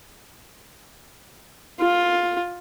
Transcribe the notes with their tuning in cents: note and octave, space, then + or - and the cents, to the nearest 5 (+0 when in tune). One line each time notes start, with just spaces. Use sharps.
F4 +10